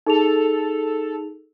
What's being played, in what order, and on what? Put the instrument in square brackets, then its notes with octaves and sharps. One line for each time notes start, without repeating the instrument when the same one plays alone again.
[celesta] D#4 G#4 F7 [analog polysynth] A4